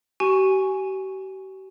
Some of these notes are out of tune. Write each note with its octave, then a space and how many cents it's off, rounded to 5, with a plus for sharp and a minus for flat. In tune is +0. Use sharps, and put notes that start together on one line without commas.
G4 -45 G#5 +0 C#6 +0